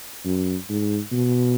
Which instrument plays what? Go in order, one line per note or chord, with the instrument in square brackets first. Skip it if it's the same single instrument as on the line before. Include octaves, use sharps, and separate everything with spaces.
[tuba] F#2
G#2
B2